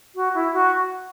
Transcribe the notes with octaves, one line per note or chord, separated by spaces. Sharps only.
F#4
E4
F#4